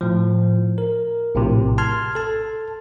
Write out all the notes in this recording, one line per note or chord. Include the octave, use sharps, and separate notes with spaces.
A2 F3
A#4
A#1 A2 C3
A5 C6 F6 G#6
A4 A5